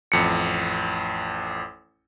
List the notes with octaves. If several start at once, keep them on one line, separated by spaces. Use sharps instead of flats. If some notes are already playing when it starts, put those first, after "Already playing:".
A1 F2 C#7